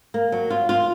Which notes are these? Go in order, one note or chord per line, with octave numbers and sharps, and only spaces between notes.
A#3
F#3
F4
F4